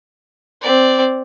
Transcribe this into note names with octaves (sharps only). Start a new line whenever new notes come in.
C4 D5